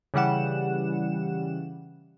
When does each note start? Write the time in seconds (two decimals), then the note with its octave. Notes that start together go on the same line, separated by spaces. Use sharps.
0.14 C#3 E3 G3 F#5 E7